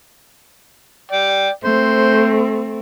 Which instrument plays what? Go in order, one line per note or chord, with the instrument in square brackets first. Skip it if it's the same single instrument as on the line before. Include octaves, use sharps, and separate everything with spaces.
[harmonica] D5 G5
[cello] A3 C4 [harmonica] C5